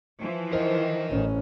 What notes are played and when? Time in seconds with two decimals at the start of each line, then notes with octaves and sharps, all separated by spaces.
0.19 E3 F3
0.53 A#4 C5 D#5
1.10 A1 C#4